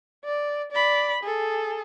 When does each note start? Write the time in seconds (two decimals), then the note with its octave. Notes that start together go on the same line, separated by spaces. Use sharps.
0.25 D5
0.72 D5 B5
1.23 G#4 A4